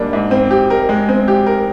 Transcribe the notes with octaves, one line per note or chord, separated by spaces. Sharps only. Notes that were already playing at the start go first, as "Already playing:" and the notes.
Already playing: G#2 G3 A#3 D4
G#2
C4
G4
A#4
G#3
C4
G4
A#4